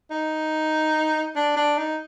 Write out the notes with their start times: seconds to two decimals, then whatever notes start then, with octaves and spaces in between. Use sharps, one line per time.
0.11 D#4
1.36 D4
1.56 D4
1.78 D#4